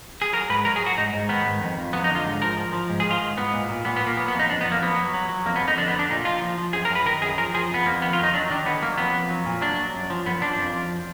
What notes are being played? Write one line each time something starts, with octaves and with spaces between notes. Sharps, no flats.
G#4
F#3 A#4
G#2 B4
F#3 A#4
G#4
F#3 F#4
G#2 D#4
G#2
D#3 B3
G#2
F2
F2
F#3 B3
D#4
D3
F4
G#2
F3 A#4
F3
F3
G#2
G#4
D#3
F4
G#2
G#2 B3
A#2
A#2
A#2 B3
B3
A#2
A#3
F#3 B3
B3
F2
D#4
F2 D4
B3
F2
A#3
F#3 B3
F#3
F#3
F#3
F2 A#3
B3
F2
D#4
D3 D4
B3
D3
D4
A#2 D#4
F3 F4
F3
F3
F#2 G#4
A#4
F#2
B4
D#3 A#4
F#2 G#4
F3 A#4
F3 G#4
F2 B3
F2 A#3
D#3 B3
F4
D#3
D#4
F#3 D4
D#3 D4
D3 B3
F#3 A#3
F2 B3
F2
F#3
A#2
F#3 D4
F#3
F#2
F3
F#2 B3
F3 D4
F2
F3